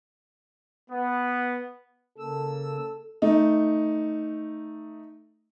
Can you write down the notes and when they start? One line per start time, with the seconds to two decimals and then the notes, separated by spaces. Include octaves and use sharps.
0.91 B3
2.18 C#3 A#3 A4 E6
3.22 A3 D#4